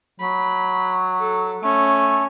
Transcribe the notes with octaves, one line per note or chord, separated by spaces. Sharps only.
F#3 B5
A4
A3 C#4